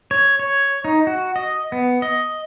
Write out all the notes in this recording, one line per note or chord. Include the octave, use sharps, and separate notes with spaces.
C#5
C#5
D#4
F#4
D#5
B3
D#5